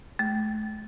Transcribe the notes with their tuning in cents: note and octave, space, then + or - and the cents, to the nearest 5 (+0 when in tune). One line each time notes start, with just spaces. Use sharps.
A3 -40